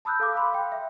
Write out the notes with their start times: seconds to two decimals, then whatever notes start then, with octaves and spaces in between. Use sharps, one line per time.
0.05 A5 B5 D#6 E6 F#6 G6
0.20 A4 F5 D6
0.35 F5 B5 C6
0.52 F5 G5
0.72 E5